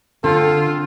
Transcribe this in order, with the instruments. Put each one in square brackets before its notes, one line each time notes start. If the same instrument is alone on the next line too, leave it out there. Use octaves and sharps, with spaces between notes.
[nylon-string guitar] D3 [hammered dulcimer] C4 [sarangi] F4 [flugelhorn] A4